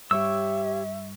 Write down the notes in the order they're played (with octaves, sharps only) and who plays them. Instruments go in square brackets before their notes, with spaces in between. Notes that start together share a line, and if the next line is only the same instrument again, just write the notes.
[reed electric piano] G2 G3 C#6 [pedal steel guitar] G4 C#5 E6 [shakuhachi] E5